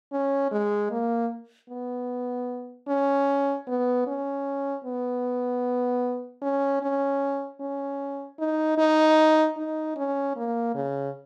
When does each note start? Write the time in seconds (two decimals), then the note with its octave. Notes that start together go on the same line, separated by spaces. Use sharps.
0.13 C#4
0.52 G#3
0.91 A#3
1.70 B3
2.88 C#4
3.67 B3
4.07 C#4
4.84 B3
6.42 C#4
6.82 C#4
7.60 C#4
8.39 D#4
8.78 D#4
9.57 D#4
9.97 C#4
10.36 A#3
10.75 C#3